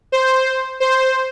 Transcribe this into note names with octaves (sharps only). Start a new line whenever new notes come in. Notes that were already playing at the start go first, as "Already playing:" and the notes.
C5
C5